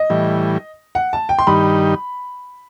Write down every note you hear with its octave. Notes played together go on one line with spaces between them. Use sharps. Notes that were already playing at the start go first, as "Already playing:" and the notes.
Already playing: D#5
A2 E3 G3
F#5
A5
G5
C6
G2 D#3 G3 D#4 B5